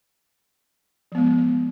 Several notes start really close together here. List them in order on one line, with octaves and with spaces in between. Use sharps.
F3 B3 G#3